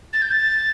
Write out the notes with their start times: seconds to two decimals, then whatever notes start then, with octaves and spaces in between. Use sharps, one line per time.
0.13 A6
0.22 G6
0.31 A6